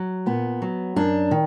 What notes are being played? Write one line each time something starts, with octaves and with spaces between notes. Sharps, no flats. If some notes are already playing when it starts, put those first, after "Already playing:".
Already playing: F#3
A#2 B3
F#3
F#2 D4
D#3